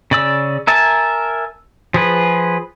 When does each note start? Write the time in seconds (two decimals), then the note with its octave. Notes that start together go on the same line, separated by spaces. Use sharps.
0.11 C#3 D5 E6
0.67 A#4 E5 G#5 A5
1.94 F3 G#4 B4